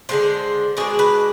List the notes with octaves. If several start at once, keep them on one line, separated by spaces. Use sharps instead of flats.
D3 G#3 B3 D4 C5
B2 G#3 D4 G#4
B4